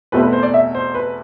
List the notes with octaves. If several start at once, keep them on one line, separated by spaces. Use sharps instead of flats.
E2 B2 A3 C4 B4
B4
C5
D5
E5
C5
B4